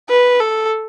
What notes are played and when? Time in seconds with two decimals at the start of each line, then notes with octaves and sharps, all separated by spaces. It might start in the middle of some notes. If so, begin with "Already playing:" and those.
0.09 B4
0.40 A4